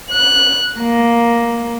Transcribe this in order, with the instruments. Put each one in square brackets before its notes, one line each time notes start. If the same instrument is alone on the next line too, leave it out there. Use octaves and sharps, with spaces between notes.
[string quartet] F#6
A#3